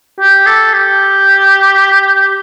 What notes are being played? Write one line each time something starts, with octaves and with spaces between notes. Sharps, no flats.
G4
A4
G4